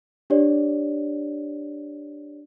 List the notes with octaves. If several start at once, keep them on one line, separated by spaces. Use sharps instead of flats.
D4 G4 C#5 D5